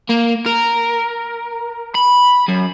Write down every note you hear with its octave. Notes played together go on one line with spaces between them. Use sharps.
A#3
A#4
B5
F#2